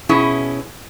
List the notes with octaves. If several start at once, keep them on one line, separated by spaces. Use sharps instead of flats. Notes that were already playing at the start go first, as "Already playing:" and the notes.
B2 C#4 E4 G#4